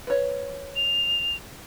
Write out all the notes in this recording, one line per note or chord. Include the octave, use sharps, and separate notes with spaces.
B4 C#5
F7